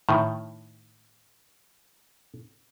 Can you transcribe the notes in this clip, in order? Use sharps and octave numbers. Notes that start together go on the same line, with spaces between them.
A2 D#3